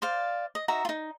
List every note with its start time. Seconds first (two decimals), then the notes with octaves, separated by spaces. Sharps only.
0.02 C5 D5 F5
0.55 D#5
0.68 D#4 F#4 E5 A#5
0.85 D#4 F4